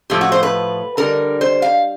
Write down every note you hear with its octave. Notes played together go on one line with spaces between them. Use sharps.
A2 F3 A3 G4
F#4
C5
B4
D3 G3 A#4
C5
F5